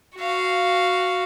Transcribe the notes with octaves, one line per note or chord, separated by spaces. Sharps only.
F#4 F5